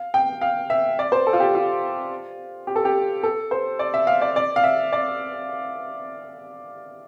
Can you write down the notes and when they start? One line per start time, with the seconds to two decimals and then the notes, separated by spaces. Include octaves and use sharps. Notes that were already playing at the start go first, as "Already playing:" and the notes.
Already playing: F5
0.14 G5
0.41 F5
0.70 E5
0.99 D5
1.12 C5
1.27 A4
1.33 F4
1.40 G4
1.55 F4
2.67 G4
2.76 A4
2.85 G4
3.23 A4
3.51 C5
3.79 D5
3.94 E5
4.07 F5
4.21 D5
4.36 D5
4.56 F5
4.64 E5
4.93 D5